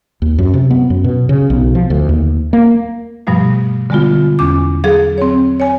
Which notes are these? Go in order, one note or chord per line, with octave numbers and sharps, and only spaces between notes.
D#2
F#2
C3
B3
F#2
B2
C#3
B1
F3
D2
D#2
A#3
G2 B2 F3 G3 A3
D3 G3 G#3 B3 F4
E2 C#4 D6
F#3 G#4 A4 F5
C4 C#5
C#5 G#5